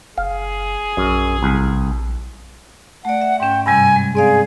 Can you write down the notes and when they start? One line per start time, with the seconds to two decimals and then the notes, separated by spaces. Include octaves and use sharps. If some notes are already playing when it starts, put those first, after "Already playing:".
0.18 F#1 G#4 F5
0.97 A#1 F#2
1.43 C2
3.05 A3 D5 F#5
3.22 E5
3.40 G#2 C#4 G5
3.66 G2 C3 G3 G#5
3.96 G#3
4.15 C4 G#4 D5 F5